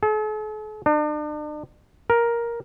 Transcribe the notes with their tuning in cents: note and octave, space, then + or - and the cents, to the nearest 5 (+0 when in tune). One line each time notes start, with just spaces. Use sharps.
A4 -45
D4 +40
A#4 +10